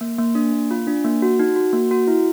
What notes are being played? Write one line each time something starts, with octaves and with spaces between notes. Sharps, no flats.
A#3
A#3
D4
A#3
F4
D4
A#3
F#4
D#4
F#4
A#3
F#4
E4